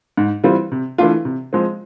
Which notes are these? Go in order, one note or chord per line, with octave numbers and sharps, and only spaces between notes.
G#2
E3 G3 C4 F4
C3
E3 A3 D4 F4
C3
F3 G#3 C4